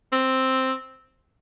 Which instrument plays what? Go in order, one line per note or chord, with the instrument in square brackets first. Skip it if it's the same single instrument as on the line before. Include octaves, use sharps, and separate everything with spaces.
[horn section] C4